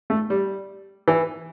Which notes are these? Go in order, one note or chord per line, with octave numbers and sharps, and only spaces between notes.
A3
G3
E3